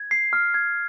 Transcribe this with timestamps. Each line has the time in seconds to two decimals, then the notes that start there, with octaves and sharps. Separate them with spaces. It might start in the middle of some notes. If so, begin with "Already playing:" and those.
Already playing: G#6
0.11 C7
0.33 F6
0.54 G#6